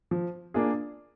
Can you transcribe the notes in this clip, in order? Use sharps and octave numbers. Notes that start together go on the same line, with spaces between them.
F3
A#3 D4 F4 G#4